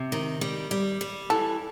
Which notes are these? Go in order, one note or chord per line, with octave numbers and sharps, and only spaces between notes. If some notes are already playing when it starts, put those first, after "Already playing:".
Already playing: C3
D#3
G3
G3
G3
E3 A4